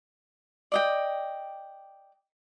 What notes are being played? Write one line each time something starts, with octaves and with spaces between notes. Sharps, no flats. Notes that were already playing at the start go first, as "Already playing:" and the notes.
D5 D#5 G5